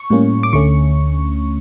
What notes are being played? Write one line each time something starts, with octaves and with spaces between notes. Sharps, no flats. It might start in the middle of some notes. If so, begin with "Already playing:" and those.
Already playing: C#6
A2 G3 A#3 C#4
D6
D2 D3 A3 C#4 C#6